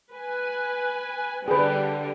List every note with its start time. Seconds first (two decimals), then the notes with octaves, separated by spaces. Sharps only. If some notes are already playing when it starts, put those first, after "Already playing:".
0.12 B4 G#5
1.48 D3 G3 G#4 B4